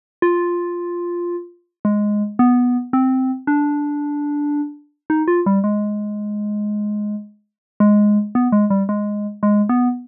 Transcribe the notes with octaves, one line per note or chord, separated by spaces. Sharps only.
F4
G#3
B3
C4
D4
D#4
F4
G3
G#3
G#3
B3
G#3
G3
G#3
G#3
B3